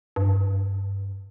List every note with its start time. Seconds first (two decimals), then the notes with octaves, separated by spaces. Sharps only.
0.16 G2